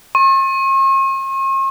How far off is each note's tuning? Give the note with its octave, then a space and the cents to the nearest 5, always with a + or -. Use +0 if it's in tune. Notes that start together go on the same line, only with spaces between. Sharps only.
C#6 -45